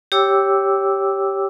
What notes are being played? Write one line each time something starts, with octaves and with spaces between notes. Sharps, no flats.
G4 C#5 G5 D6 E6